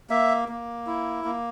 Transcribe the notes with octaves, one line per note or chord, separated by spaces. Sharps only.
A#3 E5
A#3
E4
A#3